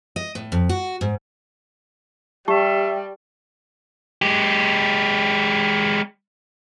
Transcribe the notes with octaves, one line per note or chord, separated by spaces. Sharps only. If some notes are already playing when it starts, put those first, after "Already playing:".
D#5
A2
F2
F#4
G#2
G3 G4 E5 A5 C#6
G#3 G4